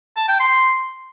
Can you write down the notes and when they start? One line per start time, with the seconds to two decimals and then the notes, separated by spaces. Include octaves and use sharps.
0.16 A5
0.28 G5
0.40 C6